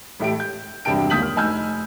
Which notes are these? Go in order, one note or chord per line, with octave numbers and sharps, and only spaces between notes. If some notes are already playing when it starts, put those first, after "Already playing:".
A1 A2 A3 G4 D7
G6
E1 G2 C3 D4 G5 D7
D#1 D#2 D#6 G6 B6 F#7
F6
F1 D#4 G#5 E6 F6 G6